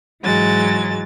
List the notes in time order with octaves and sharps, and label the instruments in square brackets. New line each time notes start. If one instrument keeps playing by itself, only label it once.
[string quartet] G#2 E3 F#3 G#3 A6